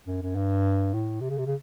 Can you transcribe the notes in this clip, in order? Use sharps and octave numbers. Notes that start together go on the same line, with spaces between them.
F#2
F#2
G2
A2
C3
C#3
C3
C#3